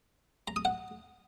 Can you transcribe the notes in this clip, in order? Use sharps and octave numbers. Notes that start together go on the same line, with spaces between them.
A#5
D#6
F#5